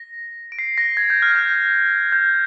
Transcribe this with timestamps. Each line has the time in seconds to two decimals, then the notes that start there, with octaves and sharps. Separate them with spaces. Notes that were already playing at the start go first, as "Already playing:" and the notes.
Already playing: A#6
0.52 D7
0.59 C7
0.78 A#6
0.97 G#6
1.10 G6
1.22 F6
1.35 G6
2.12 G6